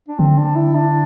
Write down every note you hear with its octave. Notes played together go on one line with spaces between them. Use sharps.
D4
D3 C4
D4
E4
D4